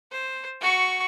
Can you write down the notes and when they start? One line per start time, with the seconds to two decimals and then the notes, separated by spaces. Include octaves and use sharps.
0.12 C5
0.61 F#4 C#6